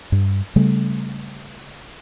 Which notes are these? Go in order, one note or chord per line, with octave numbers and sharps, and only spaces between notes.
G2
C#3 G3 A3